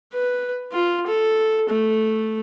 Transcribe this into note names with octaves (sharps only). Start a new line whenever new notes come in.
B4
F4
A4
A3